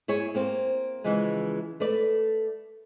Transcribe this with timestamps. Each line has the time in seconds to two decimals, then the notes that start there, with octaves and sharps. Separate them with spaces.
0.08 E4 G#4 C#5
0.35 A#3 C4 C5
1.04 C#3 E3 F3 G#3
1.80 A3 B4 D5